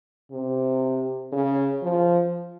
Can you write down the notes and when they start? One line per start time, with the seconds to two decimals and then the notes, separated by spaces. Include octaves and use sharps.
0.32 C3
1.32 C#3
1.82 F3